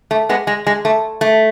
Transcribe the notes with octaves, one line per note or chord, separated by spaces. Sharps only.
A3
G#3 B3
G#3
G#3
A3
A3